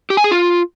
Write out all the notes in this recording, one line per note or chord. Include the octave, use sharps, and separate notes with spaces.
G4
G#5
G#4
F4